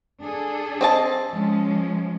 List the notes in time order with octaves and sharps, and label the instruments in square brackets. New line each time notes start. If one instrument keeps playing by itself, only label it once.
[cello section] D4 G#4 A4
[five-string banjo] C4 D#5 A5
[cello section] F3 G#3 C#4